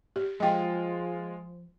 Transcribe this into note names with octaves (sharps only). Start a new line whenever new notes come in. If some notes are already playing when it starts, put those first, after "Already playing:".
G4
F3 G#3 F4 D#5 G5